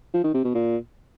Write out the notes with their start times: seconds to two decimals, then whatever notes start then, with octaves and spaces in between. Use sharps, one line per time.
0.14 F3
0.24 D#3
0.34 C3
0.44 B2
0.55 A#2